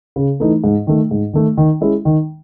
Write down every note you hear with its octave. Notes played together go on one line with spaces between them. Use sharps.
C#3
E3 A3 D#4
G#2
D#3 A3
G#2
D#3 A3
D#3
G#3 C#4 E4
D#3